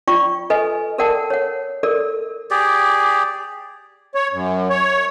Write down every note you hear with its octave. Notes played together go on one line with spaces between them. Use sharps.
F4 D5 G5 C#6
A4 B4 D#5 G#5
A4 A#4 D5 F#5 G5 A5
C#5 F#5
A4 A#4 D5
G4 G#4 D5
C#5
F#2
C#5